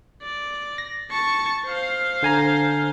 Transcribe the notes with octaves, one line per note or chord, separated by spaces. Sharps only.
D5
A#6
A5 C#6
C5 F5
D3 G#5 A#5